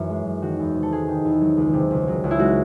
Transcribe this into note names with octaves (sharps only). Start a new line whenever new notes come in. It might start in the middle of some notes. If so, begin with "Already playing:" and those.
Already playing: F#2 E3
G#3
F#2
D#3 F#4
E2
C3
A4
G#3 G#4
D#3
E2
F#3
C#2
C3
C#2
F#3
C#2
E4
G#3 F#4